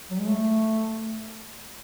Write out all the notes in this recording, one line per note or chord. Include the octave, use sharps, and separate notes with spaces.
F#3
G#3
A3